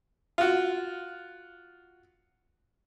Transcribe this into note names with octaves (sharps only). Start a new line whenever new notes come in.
F4 F#4